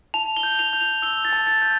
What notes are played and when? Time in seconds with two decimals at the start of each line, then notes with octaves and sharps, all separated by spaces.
0.14 A5 F7
0.37 G7
0.43 G6
0.59 F7
0.73 G6
0.81 F7
1.02 E6 G7
1.25 A6
1.33 A5
1.47 A6
1.62 G6